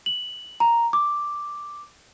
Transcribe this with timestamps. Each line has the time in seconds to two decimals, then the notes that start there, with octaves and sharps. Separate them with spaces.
0.06 F#7
0.60 A#5
0.93 D6